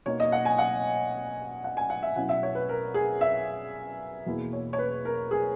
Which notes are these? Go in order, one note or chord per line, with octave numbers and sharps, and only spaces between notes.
B2 A#3 D#4 C#5
D#5
F#5
G#5
F#5
F#5
G#5
F#5
E5
B2 F#3 C#4 E4 F#5
E5
C#5
B4
A#4
G#4
E5
E2 B2 A#3 E4
C#5
C#5
B4
A#4
G#4